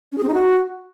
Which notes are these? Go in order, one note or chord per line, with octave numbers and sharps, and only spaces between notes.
C#4
G#4
C4
D#4
F#4